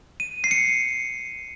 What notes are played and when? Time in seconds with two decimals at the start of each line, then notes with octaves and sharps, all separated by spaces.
0.20 D#7
0.44 C7
0.51 C#7